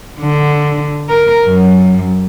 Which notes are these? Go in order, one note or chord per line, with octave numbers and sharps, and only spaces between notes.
D3
A#4
F#2